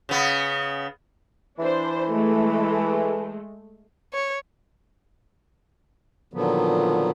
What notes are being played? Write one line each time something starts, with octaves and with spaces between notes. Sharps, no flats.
C#3 B3
E3 D4 C5
G#3 A3
C#5
A#2 D3 D#3 F3 F#3 B3